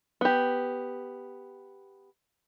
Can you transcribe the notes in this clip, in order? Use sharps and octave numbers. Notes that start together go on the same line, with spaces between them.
B3 G4